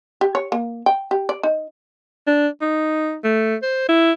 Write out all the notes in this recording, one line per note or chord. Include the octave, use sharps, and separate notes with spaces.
G4
C#5
A#3
G5
G4
D5
D#4
D4
D#4
A3
C5
E4